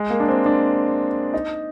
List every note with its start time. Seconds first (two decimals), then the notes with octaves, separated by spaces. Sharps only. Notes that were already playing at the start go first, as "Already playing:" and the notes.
Already playing: G#3
0.10 A#3
0.20 D4
0.28 C4
0.46 D4
1.34 D#4